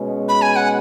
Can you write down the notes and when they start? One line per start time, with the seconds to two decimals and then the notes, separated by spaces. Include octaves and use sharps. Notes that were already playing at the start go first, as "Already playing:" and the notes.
Already playing: B2 G#3 C#4
0.29 B5
0.42 G#5
0.56 F#5